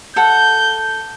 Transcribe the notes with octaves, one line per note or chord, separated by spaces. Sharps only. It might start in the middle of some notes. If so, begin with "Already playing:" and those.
A4 F#5 G6